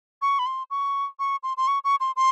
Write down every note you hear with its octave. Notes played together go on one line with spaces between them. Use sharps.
C#6
B5
C6
C#6
C#6
C6
C6
C#6
C#6
C6
C6